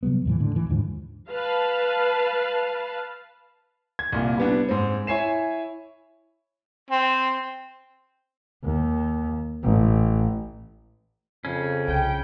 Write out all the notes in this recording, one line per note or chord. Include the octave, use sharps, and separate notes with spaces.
C3 F#3 G3 B3
D#2 A2 E3
A2 D3
A1 E3
D#2 G#2 D3 F3
B4 F5 A5
G#6
C2 A#2
G3 B3 D4
G#2 C4
E4 C#5 G#5 C7 E7
C4
D#2
A1
F2 C#3 C#4
C2 G5